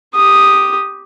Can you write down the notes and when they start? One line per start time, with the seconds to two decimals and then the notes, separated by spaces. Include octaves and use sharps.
0.14 G4 D#6